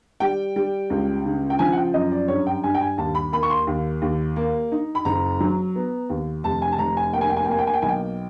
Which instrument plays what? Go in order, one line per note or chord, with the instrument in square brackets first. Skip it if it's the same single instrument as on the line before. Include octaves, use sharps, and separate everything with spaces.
[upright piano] G3 G5
G3
C#2
C#3
G5
F3 G#5
F#5
G5
F#2 D#5
D5
G2 C#5
G5
G2 G#5
G5
G#5
D#2 A5
B5
A#3 B5
C#6
C6
D#2
D#2
A#3
D#4
B5
F#1 A#5
F#3
B3
D#2
F1 A5
G#5
A5
F1 A#5
G#5
A#3 G5
G#5
G5
G#5
G5
A#3 G#5
G5
G#5
G5
B1 G#5
G5